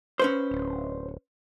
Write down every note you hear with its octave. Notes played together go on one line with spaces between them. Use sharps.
C#4 B4 C5
D1